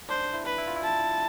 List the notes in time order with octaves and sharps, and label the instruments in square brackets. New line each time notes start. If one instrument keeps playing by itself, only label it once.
[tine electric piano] D4 [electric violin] C5
[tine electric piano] E4
[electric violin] B4
[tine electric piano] E4
F4
E4
[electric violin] A5